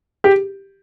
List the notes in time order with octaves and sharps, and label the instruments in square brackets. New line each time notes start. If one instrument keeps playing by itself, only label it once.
[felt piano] G4